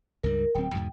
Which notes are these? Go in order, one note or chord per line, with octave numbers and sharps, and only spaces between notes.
C#2 G2 G3 A#4
D1 F#3 C4 G5
E2 G#2 B2